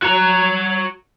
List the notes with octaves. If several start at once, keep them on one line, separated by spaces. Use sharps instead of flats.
F#4 A#5